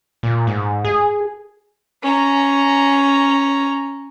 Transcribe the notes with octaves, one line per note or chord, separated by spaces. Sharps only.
A#2
G#2
G#4
C#4 A#5